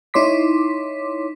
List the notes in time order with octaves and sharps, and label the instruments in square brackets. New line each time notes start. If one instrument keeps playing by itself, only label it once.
[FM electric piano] D#4 E4 C#5 C6 D6 B6